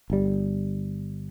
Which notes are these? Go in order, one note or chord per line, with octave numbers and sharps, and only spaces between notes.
G1 G3